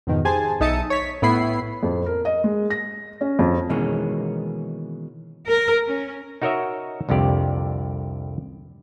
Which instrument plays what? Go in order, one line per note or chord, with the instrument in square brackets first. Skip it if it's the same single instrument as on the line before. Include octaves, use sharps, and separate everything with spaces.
[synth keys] F2 G#2 B2 D#3
G4 G#4 C5 G#5 A5
B1 D#4 E5 A5 D#6 C#7
C#5 B6
A2 B3 E4 B5 C7
[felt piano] F2
A#4
D#5
G#3
A#6
C#4
F2
[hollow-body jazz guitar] B2 D#3 E3 G#3 A#3 C#4
[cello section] A#4
C#4
[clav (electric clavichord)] D#4 F#4 A#4 C#5 D#5 E5
C2 F2 D3 G4 D5